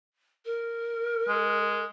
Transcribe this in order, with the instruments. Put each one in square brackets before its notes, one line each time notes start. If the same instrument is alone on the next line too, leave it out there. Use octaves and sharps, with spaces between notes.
[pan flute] A#4
[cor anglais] G#3